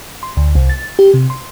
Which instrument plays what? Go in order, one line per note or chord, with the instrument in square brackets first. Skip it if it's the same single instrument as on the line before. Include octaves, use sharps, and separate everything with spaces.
[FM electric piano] C6
D2
C2
A6
G4
C3
C6